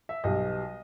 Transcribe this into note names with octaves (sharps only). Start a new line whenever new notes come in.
E5
B1 B2 G3 D#5